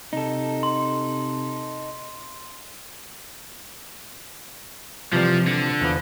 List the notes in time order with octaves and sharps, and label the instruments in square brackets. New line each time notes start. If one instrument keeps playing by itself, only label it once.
[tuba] C3 [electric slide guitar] D#4 A4
[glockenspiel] C6
[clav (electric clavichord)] C3 E3 G3 [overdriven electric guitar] F3
[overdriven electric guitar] D3
[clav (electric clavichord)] E2 F3 B4